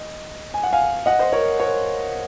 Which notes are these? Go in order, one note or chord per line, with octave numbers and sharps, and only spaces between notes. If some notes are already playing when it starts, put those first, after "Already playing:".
Already playing: D#5
G#5
F#5
F5 G#5
D#5 F#5
C5 D#5
A#4 C#5
A#4 C#5